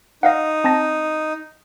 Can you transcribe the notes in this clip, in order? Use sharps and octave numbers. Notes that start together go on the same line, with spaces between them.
D#4 D#5 F5 F#5
C4 A5 A#6